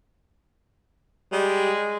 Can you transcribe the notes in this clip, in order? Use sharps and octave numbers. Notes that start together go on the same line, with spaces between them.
G3 G#3